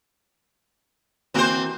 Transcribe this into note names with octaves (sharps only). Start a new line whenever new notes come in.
E3 A#3 C4 F#4 C5